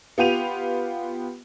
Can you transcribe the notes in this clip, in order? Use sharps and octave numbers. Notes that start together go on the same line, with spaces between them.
B3 F4 G4 D#7 F7